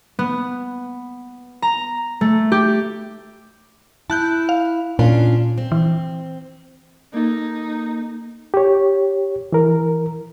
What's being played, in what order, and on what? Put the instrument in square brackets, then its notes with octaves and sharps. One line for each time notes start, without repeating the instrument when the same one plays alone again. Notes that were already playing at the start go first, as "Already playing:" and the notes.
[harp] B3
A#5
A3
G4
[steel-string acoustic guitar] E4 [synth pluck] A5 F#6 G6
[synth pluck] F5
[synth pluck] A#2 [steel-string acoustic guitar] C#4 D4 F4
[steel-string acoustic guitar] C4
[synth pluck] E3
[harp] A#3 A4 [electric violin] D#4
[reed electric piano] G4 C#5
E3 A#4